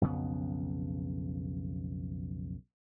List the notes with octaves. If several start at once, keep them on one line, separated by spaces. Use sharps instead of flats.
B1 F2 C#3 B3